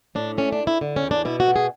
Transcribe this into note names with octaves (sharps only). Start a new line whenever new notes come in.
A2 D4
A3 C#4
D4
E2
E4
D3
C#4
E2
D4
B2 E4
F#4
A3
G#4